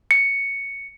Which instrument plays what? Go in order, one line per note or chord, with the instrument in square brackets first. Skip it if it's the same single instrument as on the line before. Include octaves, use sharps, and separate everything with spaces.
[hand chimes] C#7